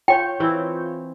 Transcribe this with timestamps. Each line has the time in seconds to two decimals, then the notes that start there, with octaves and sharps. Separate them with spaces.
0.08 F4 C#5 G5 G6
0.40 E3 C4 E4